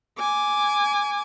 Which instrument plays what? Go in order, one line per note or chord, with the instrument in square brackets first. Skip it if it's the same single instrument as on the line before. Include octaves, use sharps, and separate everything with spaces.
[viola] G#5 D6